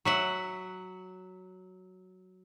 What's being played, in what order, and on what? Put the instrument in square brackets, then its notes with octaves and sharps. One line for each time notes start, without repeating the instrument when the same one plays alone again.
[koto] F#3 E5 F#5